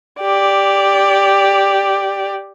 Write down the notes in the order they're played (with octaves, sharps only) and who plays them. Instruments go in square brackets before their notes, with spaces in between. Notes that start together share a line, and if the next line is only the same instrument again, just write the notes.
[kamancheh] G4 D5